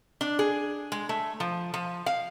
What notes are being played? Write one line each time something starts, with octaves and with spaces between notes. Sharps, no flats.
D4
G#4
G#3
A3
F3
F3
F5